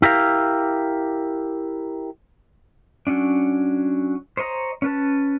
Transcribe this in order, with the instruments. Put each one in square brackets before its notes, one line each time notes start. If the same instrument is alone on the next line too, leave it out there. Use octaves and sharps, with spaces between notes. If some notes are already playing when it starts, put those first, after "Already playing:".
[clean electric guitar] E4 G4 A#4 F5
[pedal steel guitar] F#3 C#4 D4
C5 C#5 D#5 A#5
C#4 B4 A5